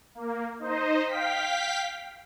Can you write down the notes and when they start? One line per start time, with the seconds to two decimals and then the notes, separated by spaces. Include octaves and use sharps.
0.15 A#3
0.59 D#4 C5 D#5
1.06 F5 G5 B6